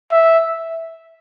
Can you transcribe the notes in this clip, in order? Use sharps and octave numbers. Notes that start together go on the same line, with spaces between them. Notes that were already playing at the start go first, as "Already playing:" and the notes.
E5